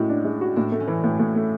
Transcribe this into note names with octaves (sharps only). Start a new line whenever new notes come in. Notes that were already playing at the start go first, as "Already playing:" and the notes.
Already playing: A2 G#3 C#4 E4 F#4
D4
G#3
F#4
A2 D4
A3
C#4
E3
A2
A2
A3